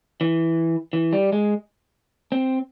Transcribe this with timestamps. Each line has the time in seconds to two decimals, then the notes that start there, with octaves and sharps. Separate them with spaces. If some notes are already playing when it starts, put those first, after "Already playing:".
0.21 E3
0.93 E3
1.13 G3
1.32 G#3
2.32 C4